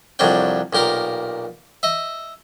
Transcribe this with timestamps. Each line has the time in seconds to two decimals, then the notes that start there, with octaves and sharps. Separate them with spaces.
0.19 C2 F2 F#3 G3 D4 G5
0.73 B1 A#2 G4 A#4 F5
1.83 D#5 E5